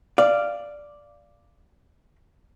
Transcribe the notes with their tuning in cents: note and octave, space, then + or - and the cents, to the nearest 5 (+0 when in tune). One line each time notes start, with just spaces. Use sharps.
D5 +0 F5 -10